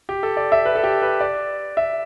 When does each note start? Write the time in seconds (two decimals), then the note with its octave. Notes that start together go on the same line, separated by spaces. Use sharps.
0.09 G4
0.23 A4
0.37 D5
0.52 E5
0.65 B4
0.75 A4
0.84 G4
1.02 B4
1.20 D5
1.77 E5